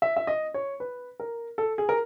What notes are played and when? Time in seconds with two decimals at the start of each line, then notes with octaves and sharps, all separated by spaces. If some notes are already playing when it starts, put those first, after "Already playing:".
0.02 E5
0.17 E5
0.27 D#5
0.54 C#5
0.80 B4
1.20 A#4
1.58 A4
1.78 G#4
1.89 A#4